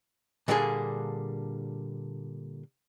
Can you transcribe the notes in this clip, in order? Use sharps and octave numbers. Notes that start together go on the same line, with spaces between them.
A#2 D3 G3 A#3 D4 G#4